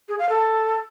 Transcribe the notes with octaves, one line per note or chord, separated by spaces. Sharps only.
G#4
F5
A4